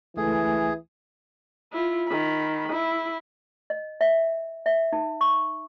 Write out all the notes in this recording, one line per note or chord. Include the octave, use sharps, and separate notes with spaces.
C#2 E3 A3 G#4
E4 F4
D#3 B5
E4
D#5
E5
E5
D#4
C#6